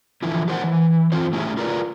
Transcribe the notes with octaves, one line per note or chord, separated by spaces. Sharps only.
D3 E3 F3 E4
G4 A#4 C5 D#5 F#5
E3
E3 C4 F4 C5
A3 C#4 E4 G4 G#4
F4 G#4 A#4 B4 D5